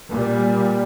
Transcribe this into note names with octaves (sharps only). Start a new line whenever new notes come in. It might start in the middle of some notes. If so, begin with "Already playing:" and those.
A#2 G3